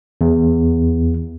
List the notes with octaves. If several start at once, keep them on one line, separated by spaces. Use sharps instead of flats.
E2